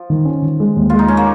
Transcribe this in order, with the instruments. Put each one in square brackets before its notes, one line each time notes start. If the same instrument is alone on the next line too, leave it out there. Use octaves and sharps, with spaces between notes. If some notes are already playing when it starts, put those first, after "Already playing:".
Already playing: [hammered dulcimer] F3
[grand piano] D#3
C#4
D#3
G#3
D#2
[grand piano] G#3 [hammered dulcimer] F4
[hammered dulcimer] D#4
C#4
A#3